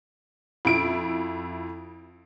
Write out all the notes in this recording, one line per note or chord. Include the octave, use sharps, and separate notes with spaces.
F2 E4 D7